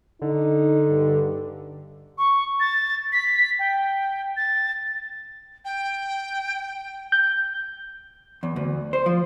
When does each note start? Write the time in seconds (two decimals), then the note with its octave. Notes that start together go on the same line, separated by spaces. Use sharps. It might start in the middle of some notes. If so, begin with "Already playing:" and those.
0.22 D3 D#4
0.89 G2
2.18 C#6
2.60 A6
3.12 B6
3.59 G5
4.37 A6
5.65 G5
7.12 G6
8.43 E2
8.56 D2
8.93 C5
9.06 F3